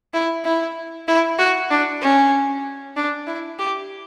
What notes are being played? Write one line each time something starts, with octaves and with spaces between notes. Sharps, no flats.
E4
E4
E4
F#4
D4
C#4
D4
E4
G4